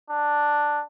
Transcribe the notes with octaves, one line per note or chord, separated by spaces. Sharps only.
D4